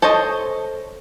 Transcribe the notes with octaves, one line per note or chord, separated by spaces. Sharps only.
A4 C5 C#5 D#5